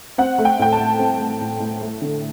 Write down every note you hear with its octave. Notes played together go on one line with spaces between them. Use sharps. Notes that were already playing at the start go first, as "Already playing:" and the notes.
C4 F#5
A3
G5
A2 G5
A5
A2
C4
A3
A2
A2
A3
D3